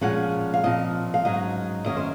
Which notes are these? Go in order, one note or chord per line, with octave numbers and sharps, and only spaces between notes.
A#2 F3 G#3 C#4 F#5
F5
A#2 F3 C4 D#5
F5
G#2 F#3 C#4 D#5
F#2 D#3 A#3 C#4 D#5
C5